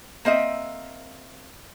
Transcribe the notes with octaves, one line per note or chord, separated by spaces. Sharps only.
A#3 C4 D#5 E5